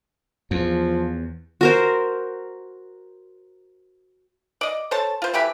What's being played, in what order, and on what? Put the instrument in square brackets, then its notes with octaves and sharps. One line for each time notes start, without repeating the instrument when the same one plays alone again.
[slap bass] E2 [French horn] F3
[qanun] F#4 A#4 C5
[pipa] D5 D#5
A4 C5 C#5 A5
F4 C5
E3 A3 G4 B5